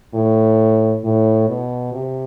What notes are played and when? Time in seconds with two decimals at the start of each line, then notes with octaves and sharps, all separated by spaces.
0.14 A2
1.04 A2
1.48 B2
1.92 C3